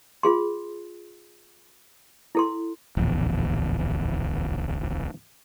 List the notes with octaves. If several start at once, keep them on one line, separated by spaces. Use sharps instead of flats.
F4 G#4 C6
E4 A4 C6
D1 A#1 E2